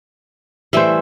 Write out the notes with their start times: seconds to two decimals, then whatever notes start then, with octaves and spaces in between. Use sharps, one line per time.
0.73 E3 G3 A3 C5 E5